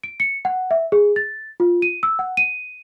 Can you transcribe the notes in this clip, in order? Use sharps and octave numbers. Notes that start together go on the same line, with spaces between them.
D7
C#7
F#5
E5
G#4
A6
F4
D#7
E6
F#5
D#7